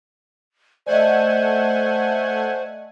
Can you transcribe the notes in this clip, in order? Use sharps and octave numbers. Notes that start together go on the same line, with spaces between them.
A3 C5 D5 D#5 F#5 G#5